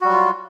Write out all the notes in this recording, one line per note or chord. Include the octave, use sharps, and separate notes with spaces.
F#3 G3 F4 F#4